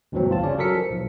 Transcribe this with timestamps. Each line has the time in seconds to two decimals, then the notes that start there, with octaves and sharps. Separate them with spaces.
0.12 D2 G2 B2 E3 F#3 C4
0.30 G1 F4 A5
0.44 C#3 C#4 D5
0.58 F#3 A4 A#4 B6 C#7
0.75 F3
0.90 B1